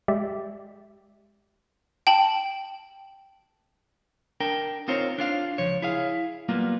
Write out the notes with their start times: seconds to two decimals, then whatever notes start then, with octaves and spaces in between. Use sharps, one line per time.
0.08 G#3 G4 D5 E5
2.07 G5 A5 F#7
4.40 D4 A#4 G5
4.88 C4 D#4 F4 A#4 C5 C#5
5.18 D4 F4 F5
5.58 C#2 F3 C#5
5.82 E4 G#4 F5
6.49 F#3 G3 A#3 B3 F4